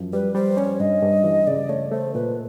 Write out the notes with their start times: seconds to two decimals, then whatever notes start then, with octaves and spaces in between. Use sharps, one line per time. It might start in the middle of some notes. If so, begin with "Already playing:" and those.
Already playing: F#2 F3
0.13 G3 B4
0.35 G3 C5
0.57 C#4 C#5
0.80 G2 D#5
1.03 G2
1.24 E3
1.47 C#3 D5
1.69 A3 C#5
1.92 A3 C5
2.14 A#2 B4